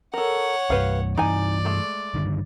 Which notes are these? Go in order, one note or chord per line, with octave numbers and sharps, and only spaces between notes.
A4 A#4 C#5 F#5
C2 G2 G4 B4 F5
G2 E3 D#4 D5 G#5
G#3 A3
G2 D3 D#3